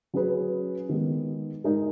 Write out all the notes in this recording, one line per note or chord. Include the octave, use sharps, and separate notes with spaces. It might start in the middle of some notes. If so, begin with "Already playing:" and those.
F#3 C#4 G#4 B4
D#3 G#3 B3
G#3 D#4 A#4 D#5